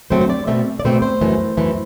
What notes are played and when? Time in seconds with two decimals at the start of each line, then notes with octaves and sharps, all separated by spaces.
0.10 G2 F#3 A3 C4 C5
0.21 C5
0.30 D5
0.47 B2 A3 C4 E5
0.80 D5
0.85 B2 A3 C4 C5
1.02 C5
1.21 F#2 E3 A3
1.57 F#2 E3 A3